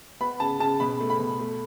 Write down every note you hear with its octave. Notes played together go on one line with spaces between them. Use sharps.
B3 B5
C#3 A5
C#3 A5
B2 B5
A3
B5
B2
A3